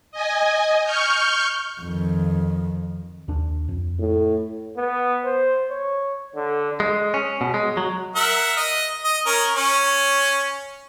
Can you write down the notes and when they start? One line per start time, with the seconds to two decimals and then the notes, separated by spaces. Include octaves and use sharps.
0.12 D#5 G#5
0.83 C#6 F6 G6
1.82 F2 D#3
3.28 D#2 D4
3.69 F2
3.99 A2
4.77 B3
5.25 C5
5.70 C#5
6.35 D3
6.80 G#3
7.14 C#4
7.41 B2
7.54 G#3
7.77 F#3
8.16 A#4 E5 F#5
8.57 D#5
9.05 D#5
9.26 C#4 A#4
9.56 C#4